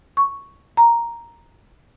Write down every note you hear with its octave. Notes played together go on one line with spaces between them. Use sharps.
C#6
A#5